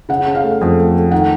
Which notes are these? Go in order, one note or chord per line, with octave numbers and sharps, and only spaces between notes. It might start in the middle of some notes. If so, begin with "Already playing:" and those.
C#3 F#5
C#3
F5
A3
F2
A3
A3
D#3 F#5